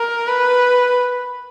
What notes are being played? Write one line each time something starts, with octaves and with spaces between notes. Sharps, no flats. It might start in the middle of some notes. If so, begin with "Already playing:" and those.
Already playing: A#4
B4